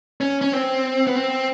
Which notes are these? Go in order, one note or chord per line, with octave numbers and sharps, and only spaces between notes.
C#4
C#4
C4
B3
C4